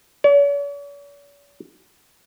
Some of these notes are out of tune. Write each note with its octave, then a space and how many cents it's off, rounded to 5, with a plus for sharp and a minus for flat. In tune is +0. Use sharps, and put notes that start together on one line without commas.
C#5 +45